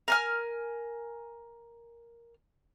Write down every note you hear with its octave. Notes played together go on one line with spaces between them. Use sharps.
A#4 G#5 F6